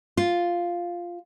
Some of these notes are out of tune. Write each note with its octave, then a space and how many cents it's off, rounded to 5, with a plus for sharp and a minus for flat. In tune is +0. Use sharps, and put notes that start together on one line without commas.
F4 +0